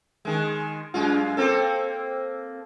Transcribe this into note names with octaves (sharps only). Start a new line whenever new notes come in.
D#3 G#3
F#2 G#3 F4
A#3 C4 A4